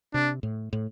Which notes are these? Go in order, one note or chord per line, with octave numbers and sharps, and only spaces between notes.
C3 D4
A2
A2